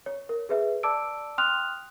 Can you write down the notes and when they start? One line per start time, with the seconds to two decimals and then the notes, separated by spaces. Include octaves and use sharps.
0.06 C#5
0.29 A#4
0.49 G#4 B4 E5
0.83 D5 A5 D6 E6 D7
1.38 G5 C6 D#6 F6 F#6 F7